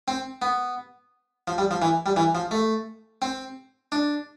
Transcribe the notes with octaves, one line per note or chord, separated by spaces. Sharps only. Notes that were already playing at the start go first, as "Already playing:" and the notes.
C4
B3
F3
G3
F3
E3
G3
E3
F3
A3
C4
D4